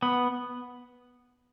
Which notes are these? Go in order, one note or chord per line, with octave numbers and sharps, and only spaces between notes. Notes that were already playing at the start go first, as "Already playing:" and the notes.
B3